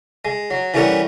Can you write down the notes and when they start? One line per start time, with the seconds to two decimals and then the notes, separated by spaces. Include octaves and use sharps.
0.25 G#3
0.50 F#3
0.74 E3 G3 A3 C#4 A#4 F#5